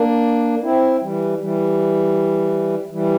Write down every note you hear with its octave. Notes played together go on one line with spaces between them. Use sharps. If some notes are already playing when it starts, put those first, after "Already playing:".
Already playing: A#3 D4
C4 E4
E3 G3
E3 G3
E3 G3